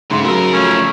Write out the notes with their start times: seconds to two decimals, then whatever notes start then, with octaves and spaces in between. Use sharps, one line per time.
0.11 G#2 C#3 A3 C6
0.25 F#3 G#4 A#4 E6
0.54 F3 A3 C#4